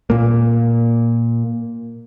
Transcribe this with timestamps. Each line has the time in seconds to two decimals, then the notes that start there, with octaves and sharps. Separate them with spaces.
0.10 A#2 A#3